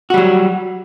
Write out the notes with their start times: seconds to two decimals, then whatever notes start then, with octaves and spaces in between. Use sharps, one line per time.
0.10 F#4
0.14 G3
0.17 F#3